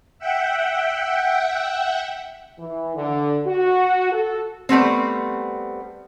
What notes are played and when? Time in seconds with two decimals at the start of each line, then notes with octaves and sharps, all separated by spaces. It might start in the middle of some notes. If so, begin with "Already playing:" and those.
0.19 E5 F#5 G5
2.59 E3
2.96 D3
3.46 F#4
4.12 A4
4.69 G3 A3 B3 C4